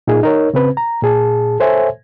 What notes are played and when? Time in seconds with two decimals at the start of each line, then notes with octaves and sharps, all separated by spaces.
0.07 A#2 D#4 F4 G#4
0.23 D#4 A#4 C#5
0.54 C#3 C4 B4
0.77 A#5
1.02 A#2 G#4 A5
1.60 A4 C5 C#5 E5 G#5